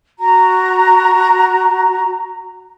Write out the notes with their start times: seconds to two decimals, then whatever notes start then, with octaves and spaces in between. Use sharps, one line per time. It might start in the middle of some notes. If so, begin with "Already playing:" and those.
0.18 F#4 A#5